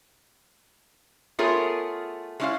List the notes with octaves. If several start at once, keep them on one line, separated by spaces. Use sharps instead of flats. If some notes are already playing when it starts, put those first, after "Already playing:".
A3 B3 F4 G#4 A#4 C#5
G#3 A3 C#4 E4 D5 F5